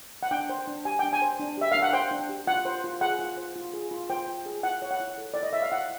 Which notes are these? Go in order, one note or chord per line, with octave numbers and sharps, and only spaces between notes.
F#5
D4 G5
C5
D4
G4 G#5
D4 G5
G#5
C5
D4
G4 E5
D4 F5
F#5
C5 G5
D4
G4
F4 F#5
C5
F4
G#4 F#5
F4
C5
F4
G#4
F4
C5 G5
F4
G#4
E4 F#5
C#5
F#5
E4
A4
E4 D5
D#5
C#5 E5
F5
E4 F#5